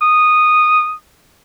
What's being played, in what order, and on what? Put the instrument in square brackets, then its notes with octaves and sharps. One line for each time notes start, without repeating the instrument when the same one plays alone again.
[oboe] D#6